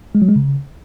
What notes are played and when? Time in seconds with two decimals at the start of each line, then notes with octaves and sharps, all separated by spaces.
0.15 G#3
0.22 F#3
0.29 G#3
0.36 C#3